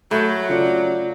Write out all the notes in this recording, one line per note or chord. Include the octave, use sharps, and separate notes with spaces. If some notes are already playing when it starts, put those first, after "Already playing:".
F#3 A3 B5 G6
C#3 F4 D5 C#7